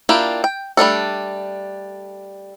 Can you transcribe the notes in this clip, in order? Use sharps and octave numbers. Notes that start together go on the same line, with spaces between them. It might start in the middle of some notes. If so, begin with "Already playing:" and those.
A#3 D4 E4 F4 G4
G5
G3 A3 D4 A4